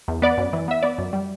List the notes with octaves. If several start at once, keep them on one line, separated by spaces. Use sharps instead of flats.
E2
B3 D5
F#2
E3
B3 E5
B3 D5
F#2
G3